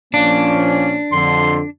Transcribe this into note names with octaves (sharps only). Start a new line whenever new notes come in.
A#2 F3 A#3 C#4 D4
F2 D3 C6